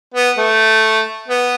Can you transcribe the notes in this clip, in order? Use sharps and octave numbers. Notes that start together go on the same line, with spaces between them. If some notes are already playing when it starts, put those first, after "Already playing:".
B3
A3
B3